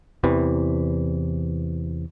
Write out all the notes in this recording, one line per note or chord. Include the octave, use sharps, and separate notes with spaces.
E2 C3 E3